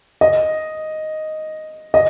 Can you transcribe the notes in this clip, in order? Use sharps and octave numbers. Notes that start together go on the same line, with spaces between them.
D#5
D#5